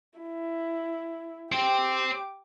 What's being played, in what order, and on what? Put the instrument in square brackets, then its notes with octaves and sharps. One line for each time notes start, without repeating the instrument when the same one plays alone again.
[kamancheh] E4
[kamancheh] G4 D6 [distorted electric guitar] C5 G5